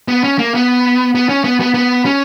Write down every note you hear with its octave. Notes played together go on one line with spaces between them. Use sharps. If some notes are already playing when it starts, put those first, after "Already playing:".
B3
C#4
A#3
B3
B3
C#4
B3
B3
B3
C#4